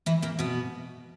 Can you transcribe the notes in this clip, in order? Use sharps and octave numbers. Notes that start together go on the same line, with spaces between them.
E3 E4
A#2 A#3
B2 B3